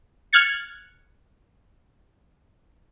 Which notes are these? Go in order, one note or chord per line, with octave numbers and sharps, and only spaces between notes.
F6 F#6 G#6 A6 C#7